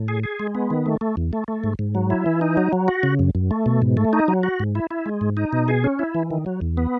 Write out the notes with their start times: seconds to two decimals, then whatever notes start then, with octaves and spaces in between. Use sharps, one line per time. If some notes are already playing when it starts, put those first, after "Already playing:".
Already playing: A2
0.08 G#4
0.24 G#4
0.40 G#3
0.55 B3
0.70 D#3
0.86 A3
1.01 A3
1.17 E2
1.33 A3
1.48 A3
1.64 G#2
1.79 G#2
1.95 F#3
2.10 E4
2.26 E3
2.41 D#4
2.57 F#3
2.73 F#3
2.88 F#4
3.03 C#3
3.19 F#2
3.35 F#2
3.51 A3
3.66 B2
3.82 G#2
3.97 A3
4.13 D#4
4.28 F#3
4.43 F#4
4.60 G#2
4.75 E4
4.91 E4
5.06 G#3
5.21 G#2
5.37 D#4
5.53 B2
5.68 G#4
5.84 C#4
5.99 E4
6.15 E3
6.31 D#3
6.46 F#3
6.61 E2
6.77 B3